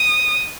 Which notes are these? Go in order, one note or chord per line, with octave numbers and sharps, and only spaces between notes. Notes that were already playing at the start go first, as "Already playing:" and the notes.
Already playing: D#6